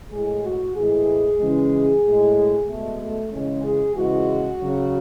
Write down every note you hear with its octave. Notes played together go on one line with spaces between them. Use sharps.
A2 G#3 G#4
F#4
A2 E3 G#3 G#4
C#3 E3 G#3
A2 G#3
B2 G#3 A3
A3
C#3 E3 G#3 C#4
G#4
C#3 E3 G#3 F#4
C#3 F#3